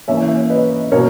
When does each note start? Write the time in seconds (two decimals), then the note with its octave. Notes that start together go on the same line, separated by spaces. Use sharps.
0.08 E3 A#3 C#4 C#5 E5
0.50 B4 D#5
0.92 B2 A#3 C#4 A#4 C#5